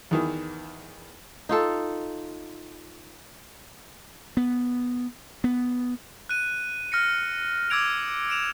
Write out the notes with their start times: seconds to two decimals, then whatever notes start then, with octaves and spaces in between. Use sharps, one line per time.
0.11 E2 D#3 E3
1.49 D#4 F4 A4
4.37 B3
5.44 B3
6.29 F#6 D#7
6.92 F6 A#6 C#7
7.70 D6 E6 F6 G#6 D7 F7
8.30 D7 E7 F7